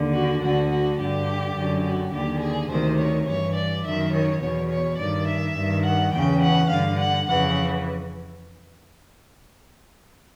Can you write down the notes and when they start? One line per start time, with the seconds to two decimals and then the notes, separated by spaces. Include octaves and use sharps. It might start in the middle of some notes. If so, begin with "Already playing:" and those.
Already playing: D#2 D3
0.12 F#4
0.40 D2 D3 F#4
0.69 F#4
0.98 G2 D3 G4
1.54 F#2 D3
1.83 F#4
2.12 D#2 D3 G4
2.40 G#4
2.70 D2 C3 D#3 C5
2.98 C#5
3.26 G2 E3 C#5
3.55 D5
3.84 F#2 D#3 E5
4.12 C#5
4.41 E2 B2 C#5
4.70 C#5
4.98 G2 D#3 D5
5.27 E5
5.56 G2 D#3
5.84 F#5
6.13 E2 C#3 E3 G5
6.42 F#5
6.69 G2 D3 F5
6.98 F#5
7.27 F2 C#3 E3 F#5